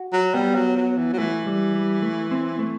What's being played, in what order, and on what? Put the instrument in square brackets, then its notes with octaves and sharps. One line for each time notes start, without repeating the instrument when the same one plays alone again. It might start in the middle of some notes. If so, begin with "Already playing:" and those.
Already playing: [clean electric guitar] F#4
[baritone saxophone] F#3
[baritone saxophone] G3 [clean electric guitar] B3
[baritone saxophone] F#3
F#3
E3
F#3
[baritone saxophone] E3 [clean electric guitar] A3
[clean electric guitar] G3
G3
A3
C4
A3